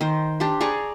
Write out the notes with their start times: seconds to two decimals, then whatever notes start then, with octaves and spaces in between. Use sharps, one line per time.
0.01 D#3 C5
0.40 D4 G4 C5
0.61 G#4 D5 A#5 C#6